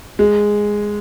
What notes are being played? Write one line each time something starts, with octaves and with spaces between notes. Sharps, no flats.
G#3